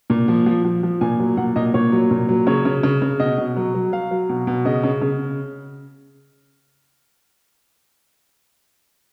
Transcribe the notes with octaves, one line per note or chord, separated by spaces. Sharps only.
A#2
F3
F3
F3
F3
A#2 G#5
F#3
A#2 F#5
A#2 D#5
A#2 C#5
F#3
A#2
F#3
C#3 C#5
C#3
C#3
C#3
B2 D#5
B2
F#3
F#3
F#3 F5
F#3
B2
B2
C#3 D#5
C#3
C#3